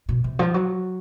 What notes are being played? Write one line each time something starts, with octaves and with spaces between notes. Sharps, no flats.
B2
C3
F3
F#3